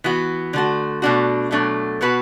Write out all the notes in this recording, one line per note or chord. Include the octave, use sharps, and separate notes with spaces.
E3 B3 F#4
D3 A3 F#4
B2 A3 D4 F#4
B2 F#3 A3 D4
B2 B3 F#4 B4